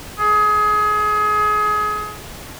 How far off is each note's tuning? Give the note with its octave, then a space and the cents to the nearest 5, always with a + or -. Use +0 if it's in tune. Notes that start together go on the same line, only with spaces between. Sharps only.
G#4 +25